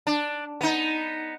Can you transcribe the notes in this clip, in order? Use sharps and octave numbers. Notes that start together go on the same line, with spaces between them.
D4
B3 D#4